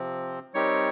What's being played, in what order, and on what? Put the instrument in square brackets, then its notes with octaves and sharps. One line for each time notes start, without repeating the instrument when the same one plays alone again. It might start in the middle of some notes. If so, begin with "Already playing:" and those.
Already playing: [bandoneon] C3 F3 C4
[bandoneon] G3 C4 D#4 G4 A#4 [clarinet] C#5